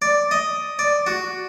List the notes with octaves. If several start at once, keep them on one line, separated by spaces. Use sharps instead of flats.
D5
D#5
D5
F#4